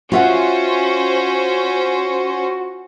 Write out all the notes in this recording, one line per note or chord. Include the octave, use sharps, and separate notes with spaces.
C#4 F4 F#4 C5 E5 F#5